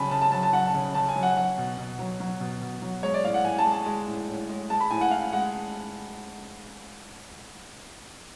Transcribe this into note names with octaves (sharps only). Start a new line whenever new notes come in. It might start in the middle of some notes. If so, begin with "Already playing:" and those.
Already playing: C#3 F#3 G#5 A5 B5
C#3 A5
A5
F#3 A5
A5
F#3 F#5
A5
C#3
C#3 A5
G#5
F#3
F#5
F#3 F#5
B2
B2
F#3
F#3
B2
B2
F#3
G#3 C#5
D5
A2 F5
F#5
A2 G#5
A5
G#3
A5
G#3
A2
A2
G#3
G#3 A5
B5
A2 G#5
F#5
A2 F5
G#3 F#5